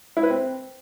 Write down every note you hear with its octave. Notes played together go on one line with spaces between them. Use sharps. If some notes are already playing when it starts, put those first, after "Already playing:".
E4
B4
C4